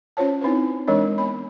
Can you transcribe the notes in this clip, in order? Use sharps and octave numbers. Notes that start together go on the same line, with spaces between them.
C#4 F4 C5 C#5 A5
C4 D#4 E4 B4 C5
E3 G#3 D4 A#4 C#5
B3 B5